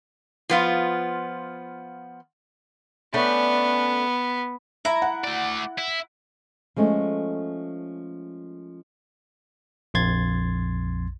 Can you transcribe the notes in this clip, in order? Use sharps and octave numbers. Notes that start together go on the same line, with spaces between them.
F3 B3 F4
A3 B3 C#4 D4
E4 E5 A#5
F#5
A3 D5
E4
F3 G#3 A3 C#4
A#1 F2 C6 G#6 A6